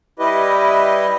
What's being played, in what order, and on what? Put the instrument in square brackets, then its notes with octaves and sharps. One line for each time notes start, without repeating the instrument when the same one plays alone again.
[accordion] G3 E4 G4 B4 D#5